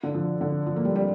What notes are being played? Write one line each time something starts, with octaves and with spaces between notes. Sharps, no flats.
D3
F3
D3
F3
A#3
G3
G3